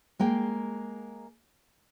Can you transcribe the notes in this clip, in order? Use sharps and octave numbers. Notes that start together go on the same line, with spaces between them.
G#3 A#3 G5